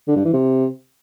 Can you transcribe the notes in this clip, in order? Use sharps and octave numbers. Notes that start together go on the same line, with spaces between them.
D3
G2
E3
C3